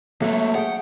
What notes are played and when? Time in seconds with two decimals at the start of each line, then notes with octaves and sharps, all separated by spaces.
0.22 F#3 A3 A#3 A4
0.55 G#4 F#5 G5